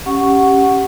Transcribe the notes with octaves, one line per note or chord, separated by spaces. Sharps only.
C#4 G4 F#5 C#6